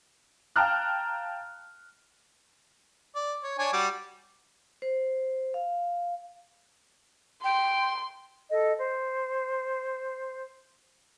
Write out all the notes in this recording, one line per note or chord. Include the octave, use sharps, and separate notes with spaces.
F5 G5 A5 A#5 F6 F#6
D5
C#5
D4 C#5 G#5
G3 F#4 D6
C5
F5
G5 C6
A4 D#5
C5